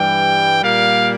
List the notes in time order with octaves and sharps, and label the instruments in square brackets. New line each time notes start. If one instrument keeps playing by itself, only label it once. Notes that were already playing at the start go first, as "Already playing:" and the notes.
Already playing: [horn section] G2 E3 G3 G5
A#2 G3 A#3 F5